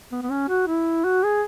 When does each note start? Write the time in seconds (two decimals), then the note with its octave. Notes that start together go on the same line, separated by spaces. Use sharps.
0.12 B3
0.22 B3
0.30 C#4
0.49 F#4
0.67 E4
1.05 F#4
1.24 G#4